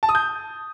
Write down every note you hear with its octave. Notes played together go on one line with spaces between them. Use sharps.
A5
D#6
G6